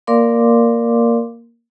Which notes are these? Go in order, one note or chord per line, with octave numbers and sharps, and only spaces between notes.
A#3 A#4 D5 F5 C6 D6